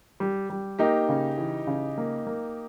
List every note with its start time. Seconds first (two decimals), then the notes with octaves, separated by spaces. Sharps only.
0.20 G3
0.50 G3
0.79 A#3 D#4 G4
1.09 C#3
1.38 E3
1.67 C#3
1.98 A#3
2.27 A#3